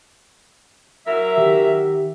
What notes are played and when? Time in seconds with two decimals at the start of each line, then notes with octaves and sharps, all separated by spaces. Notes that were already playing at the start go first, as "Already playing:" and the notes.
1.07 F#3 A#4 E5
1.37 D#3 G4